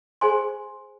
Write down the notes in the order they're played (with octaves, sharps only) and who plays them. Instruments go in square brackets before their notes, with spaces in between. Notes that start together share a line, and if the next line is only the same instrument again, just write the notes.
[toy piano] G#4 C5 G#5 C6